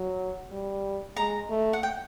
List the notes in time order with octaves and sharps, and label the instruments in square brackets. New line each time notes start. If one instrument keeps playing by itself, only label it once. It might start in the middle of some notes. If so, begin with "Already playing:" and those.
Already playing: [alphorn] F#3
G3
[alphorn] G#3 [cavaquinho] A#5
[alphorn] A3
[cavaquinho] F#5
G5